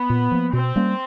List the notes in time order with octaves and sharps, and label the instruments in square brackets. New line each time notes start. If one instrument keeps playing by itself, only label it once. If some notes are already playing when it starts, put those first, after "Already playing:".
Already playing: [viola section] B3
[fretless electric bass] A#2
F3 A#3
[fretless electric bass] B2 [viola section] C4
[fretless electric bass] G3 A#3 C#4